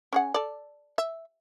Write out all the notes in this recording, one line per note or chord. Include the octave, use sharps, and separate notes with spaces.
C#4 G#4 F#5
A4 D5
E5